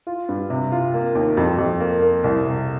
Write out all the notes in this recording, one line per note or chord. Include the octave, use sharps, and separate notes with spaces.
F4
G2
C3
F4
A#3
D#2
F2
F2
A#3
A#3
C2
C3